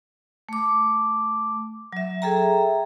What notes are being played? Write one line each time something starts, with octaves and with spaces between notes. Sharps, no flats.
A3 D6
F#3 E5
G#4 A4 E5 G5 A#5